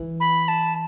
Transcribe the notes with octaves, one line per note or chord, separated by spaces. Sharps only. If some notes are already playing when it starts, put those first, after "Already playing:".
Already playing: E3
B5
A5